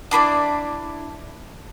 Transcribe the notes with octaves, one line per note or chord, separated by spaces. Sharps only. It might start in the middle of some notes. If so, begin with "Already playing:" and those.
D4 E4 B4 D5